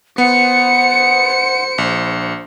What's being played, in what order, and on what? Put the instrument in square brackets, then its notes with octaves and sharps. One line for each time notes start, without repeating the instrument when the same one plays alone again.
[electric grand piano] B3 [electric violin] C5 C#7 [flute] F#5
[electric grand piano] A#1